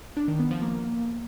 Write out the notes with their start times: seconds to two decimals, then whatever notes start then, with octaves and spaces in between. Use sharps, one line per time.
0.17 D4
0.28 D#3
0.39 B3
0.51 F3
0.62 A#3